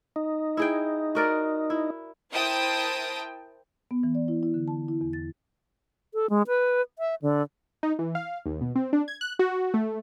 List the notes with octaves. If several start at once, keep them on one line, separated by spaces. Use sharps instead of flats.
D#4
E4 G#4 G5
F#4 A#4 D5
E4
E4 A#4 C5 G5 A5 D#6
B3
E3
D5
E4
E4
D3
A5
E4
E2
A6
A4
G#3
B4
E5
D3
D#4
E3
F5
D#2
B2
C4
D4
G#6
F#6
F#4
A3